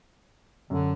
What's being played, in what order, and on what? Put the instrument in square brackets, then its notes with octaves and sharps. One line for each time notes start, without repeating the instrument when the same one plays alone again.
[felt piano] F#2 [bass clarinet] D3